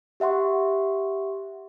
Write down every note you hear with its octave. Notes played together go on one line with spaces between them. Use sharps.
G4 E5 F#5 C6 C#6